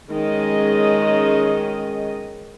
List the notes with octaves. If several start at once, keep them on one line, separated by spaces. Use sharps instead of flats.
D#3 G#3 C#4 D#5